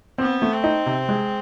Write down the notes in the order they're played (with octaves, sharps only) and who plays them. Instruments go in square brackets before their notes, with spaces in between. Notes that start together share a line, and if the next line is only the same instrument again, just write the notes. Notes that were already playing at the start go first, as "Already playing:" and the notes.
[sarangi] B3 [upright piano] C4
[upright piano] A3
[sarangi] C4
[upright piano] D#4
C3
G#3